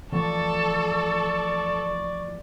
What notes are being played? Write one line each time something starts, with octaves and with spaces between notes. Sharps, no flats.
E3 F3 A3 A4 D5 C#6